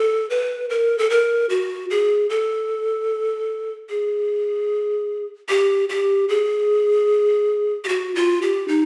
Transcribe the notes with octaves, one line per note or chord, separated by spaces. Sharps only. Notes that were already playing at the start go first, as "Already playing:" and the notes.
Already playing: A4
B4
A#4
A4
A#4
F#4
G#4
A4
G#4
G4
G4
G#4
G4
F#4
F4
G4
D#4